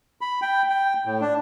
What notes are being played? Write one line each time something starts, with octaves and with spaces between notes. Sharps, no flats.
B5
G5
G5
A2
D4